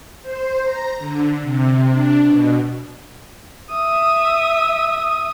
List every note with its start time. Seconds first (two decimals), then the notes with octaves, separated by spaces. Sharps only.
0.23 C5
0.63 A#5
0.99 D3
1.41 C3
1.91 D4
2.24 B2
3.72 E5 D#6